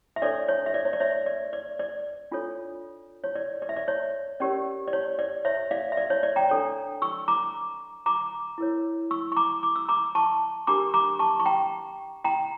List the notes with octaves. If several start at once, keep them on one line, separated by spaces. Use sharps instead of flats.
E5
D4 A4 C#5 D5
C#5
E5
D5
C#5
D5
C#5 E5
D5
D5
D5
D4 F4 A4 C#5
C#5
D5
D5
E5
D5
C#5
C#4 G4 A#4 C#5 D5
D5
C#5
D5
C#5 E5
D5 F5
E5
D5
C#5
D5
G5 A#5
D4 A4 C#5
C#6 E6
A#5 D6
A#5 D6
E4 A#4 C#5
C#6 E6
C#6
A#5 D6
D6
E6
A#5 D6
A5 C#6
D4 G4 A#4 A#5 D6
A#5 D6
A5 C#6
C#6
G5 A#5
G5 A#5